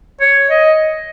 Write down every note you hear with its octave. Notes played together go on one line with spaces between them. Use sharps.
C#5
D#5